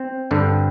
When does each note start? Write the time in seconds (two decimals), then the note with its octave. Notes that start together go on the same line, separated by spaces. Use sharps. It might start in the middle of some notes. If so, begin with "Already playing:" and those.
Already playing: C4
0.31 G2 D3 G3